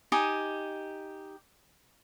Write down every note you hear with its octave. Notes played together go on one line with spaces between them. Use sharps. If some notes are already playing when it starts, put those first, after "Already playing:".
D#4 G4 G#5 D#6